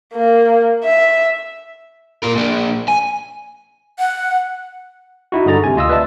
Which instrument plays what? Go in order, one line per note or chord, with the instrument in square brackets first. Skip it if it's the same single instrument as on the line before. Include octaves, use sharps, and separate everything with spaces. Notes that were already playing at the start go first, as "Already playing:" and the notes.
[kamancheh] A#3
E5
[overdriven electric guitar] A#2 A#4
A#2 D4
G#5
[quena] F#5
[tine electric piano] D#4 E4 F#4
G2 D3 G#4 A#5 A6
C3 G#5
D2 F4 D#5 D#6 E6
B4 D5 E5 A5